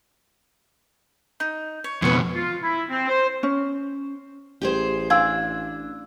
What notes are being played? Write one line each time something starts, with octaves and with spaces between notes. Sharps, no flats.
D#4
C#5
F2 B2 B4 C#5
F4
E4
C4
C5
C#4
A1 G4 G#4 C5
D4 F5 G#5 C6 E6 G#6